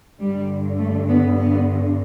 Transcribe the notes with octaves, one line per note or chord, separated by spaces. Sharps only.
G2 D3 G3
A3
B3
B3